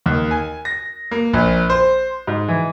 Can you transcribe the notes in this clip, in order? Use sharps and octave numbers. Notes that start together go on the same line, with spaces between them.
D#2
G#5
A#6
A#3
A#1
C5
G#2
E3